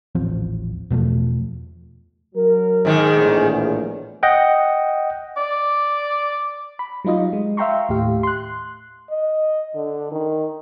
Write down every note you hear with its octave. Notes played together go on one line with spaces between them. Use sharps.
D#1 A1 F3 C4
E2 B2 F3 A3
F#3 A#4
G#2 D#3
A#1 E2 A2
D#5 F#5 G5
D5
B5
F#3 G3 D#4 F4 D#5
G#3
E5 F5 G5 A#5 C6 C#6
D#2 A2 G4 F5
C6 F#6
D#5
D3
D#3